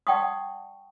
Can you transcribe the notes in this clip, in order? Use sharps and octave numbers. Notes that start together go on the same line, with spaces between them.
D5 F#5 G5 A5 C#6 D#6